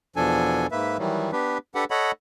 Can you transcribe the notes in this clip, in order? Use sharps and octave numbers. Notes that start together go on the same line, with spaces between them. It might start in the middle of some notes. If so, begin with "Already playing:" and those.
E2 B2 F3 D4 A4 G#5
G#2 A#3 B4 E5
D#3 E3 F#3 G3
B3 D4 G4 B4
D4 G4 A4 B4 F#5
A4 C#5 D#5 F#5 B5